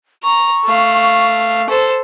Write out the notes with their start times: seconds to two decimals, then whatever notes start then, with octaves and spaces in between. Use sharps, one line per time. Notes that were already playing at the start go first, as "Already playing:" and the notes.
0.24 A#5 C#6
0.65 A3 F5
1.69 A4 C5